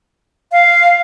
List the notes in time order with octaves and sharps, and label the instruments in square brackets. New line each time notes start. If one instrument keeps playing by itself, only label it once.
[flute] F5